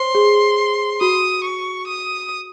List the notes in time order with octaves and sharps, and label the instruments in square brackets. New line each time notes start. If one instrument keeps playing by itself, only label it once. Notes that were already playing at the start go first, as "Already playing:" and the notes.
Already playing: [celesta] C5 C#5 [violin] C6
[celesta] G#4
[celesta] F#4 [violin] D#6
[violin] C#6
D#6